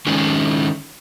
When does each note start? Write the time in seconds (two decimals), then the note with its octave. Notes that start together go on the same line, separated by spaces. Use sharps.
0.07 D#3 G#3 C#4